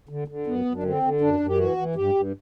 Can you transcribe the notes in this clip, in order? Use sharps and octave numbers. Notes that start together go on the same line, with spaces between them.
D3
D3
F#2 B3
F#2
D4
D3 C4
D3
F#2 D4
F#2
G4
E3 F#4
E3
G2 G4
G2